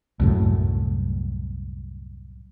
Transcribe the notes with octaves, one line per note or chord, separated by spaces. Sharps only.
C2 F#2 A2